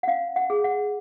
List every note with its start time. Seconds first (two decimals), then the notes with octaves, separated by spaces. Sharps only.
0.03 F#5
0.07 C#4 F5
0.36 F#5
0.50 G#4
0.64 F#5